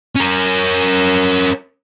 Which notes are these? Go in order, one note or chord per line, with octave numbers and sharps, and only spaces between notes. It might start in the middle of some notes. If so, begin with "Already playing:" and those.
C#4 A#4